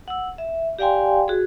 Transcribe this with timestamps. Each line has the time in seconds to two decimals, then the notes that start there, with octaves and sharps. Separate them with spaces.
0.08 F#5 E6
0.38 E5
0.79 G4 D5 F5 G5 G#5 C6
1.28 F#4 G#4